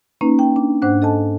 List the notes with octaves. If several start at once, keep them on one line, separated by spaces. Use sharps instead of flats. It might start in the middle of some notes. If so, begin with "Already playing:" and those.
A#3 C#4 D#4 B4
G5
D4
G#2 D4 C5 F#5 F#6
A4 D#5 G#5 A5